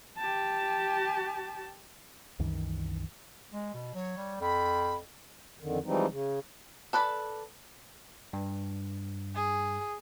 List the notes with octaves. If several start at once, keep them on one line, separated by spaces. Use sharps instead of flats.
G4 A5
C2 F#2 D#3 E3
G#3
B2
F#3 C#5
G3
F2 B5
F2 D3 D#3
E3 F3 G3 G#3 C4 D#4
C#3
A4 B4 D5 B5
G2
G#4